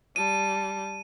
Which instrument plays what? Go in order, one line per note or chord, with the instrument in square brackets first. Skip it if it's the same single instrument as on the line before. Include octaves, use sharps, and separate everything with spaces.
[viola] G3 A5 [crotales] D#7